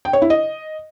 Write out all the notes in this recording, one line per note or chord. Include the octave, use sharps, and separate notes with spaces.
G5
C#5
E4
D#5